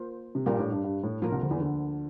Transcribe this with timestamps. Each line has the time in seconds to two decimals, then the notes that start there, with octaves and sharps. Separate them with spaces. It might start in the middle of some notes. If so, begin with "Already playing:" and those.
Already playing: A#3 F4 C5
0.35 C3
0.46 A#1 A#2 G3 D4 G4 A#4
0.54 G2
0.59 A2
0.72 G2
0.84 G2
1.03 A2
1.22 A2 F3 A#3 F4 A#4
1.32 C2 C3
1.41 D2 D3
1.51 E2 E3
1.60 D2 D3